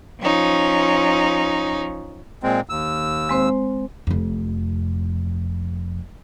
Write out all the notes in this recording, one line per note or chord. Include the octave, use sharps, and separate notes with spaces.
F3 C#4 D#4
A#2 G#3 C4
D#2 E6
G#3 C4 C5
F1 F2